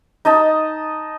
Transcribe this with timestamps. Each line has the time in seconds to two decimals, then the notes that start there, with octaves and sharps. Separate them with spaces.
0.25 D#4 D#5 A5